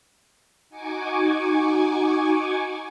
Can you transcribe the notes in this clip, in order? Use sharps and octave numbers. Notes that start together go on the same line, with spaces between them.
D#4 F#4 G#5 C#6 D6